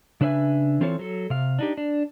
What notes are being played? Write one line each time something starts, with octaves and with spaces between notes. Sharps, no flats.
C#3 D4 B4 C5 E5 G#5
E3 C4 F4 A4 C5 C#5
F#3 A4
C3 F5
D4 D#4 G4
D4